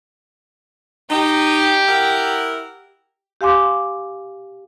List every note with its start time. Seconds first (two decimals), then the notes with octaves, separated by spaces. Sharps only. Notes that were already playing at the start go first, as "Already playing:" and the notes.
1.10 D#4 G4
1.87 E4 A#4 F#5
3.41 G4 F5 G#5 C6 D6